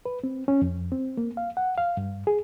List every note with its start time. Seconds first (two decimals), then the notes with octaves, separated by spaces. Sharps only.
0.06 B4
0.24 C4
0.48 C#4
0.62 F2
0.92 C4
1.17 A#3
1.37 F5
1.57 F#5
1.78 F5
1.97 G2
2.27 G#4